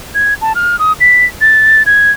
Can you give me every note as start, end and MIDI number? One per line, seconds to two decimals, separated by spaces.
0.15 0.34 92
0.41 0.53 81
0.55 0.78 89
0.79 0.92 87
1.00 1.25 95
1.41 1.83 93
1.86 2.11 92